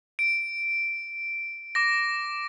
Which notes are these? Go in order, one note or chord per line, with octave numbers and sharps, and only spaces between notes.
D7
D6 A#6